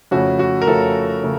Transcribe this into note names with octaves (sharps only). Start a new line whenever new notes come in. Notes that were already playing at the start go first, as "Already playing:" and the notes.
F2 C#3 A3 C#4 F#4
F#4
A#4
F2 C#3 A3 C#4 A4
C#3 A3